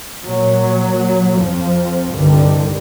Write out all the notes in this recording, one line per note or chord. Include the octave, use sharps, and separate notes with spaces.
A#2 F#3
F2 F3
C2 G2 D3 D#3 G3